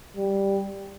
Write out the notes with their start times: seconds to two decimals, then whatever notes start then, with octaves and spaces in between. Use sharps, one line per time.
0.17 G3